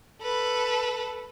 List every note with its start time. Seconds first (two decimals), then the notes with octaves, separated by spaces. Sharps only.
0.22 A4 B4